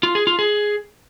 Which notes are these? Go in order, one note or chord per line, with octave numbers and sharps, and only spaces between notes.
F4
G#4
F4
G#4